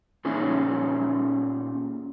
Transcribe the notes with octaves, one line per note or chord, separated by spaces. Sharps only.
A#2 C#4 D#4 G#4 C#5 E5